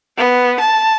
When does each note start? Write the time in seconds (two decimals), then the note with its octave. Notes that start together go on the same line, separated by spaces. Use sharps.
0.18 B3
0.60 A5